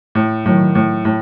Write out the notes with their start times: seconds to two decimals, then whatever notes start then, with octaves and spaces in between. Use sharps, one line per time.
0.15 A2
0.45 A2 D#3 F#3
0.75 A2
1.05 A2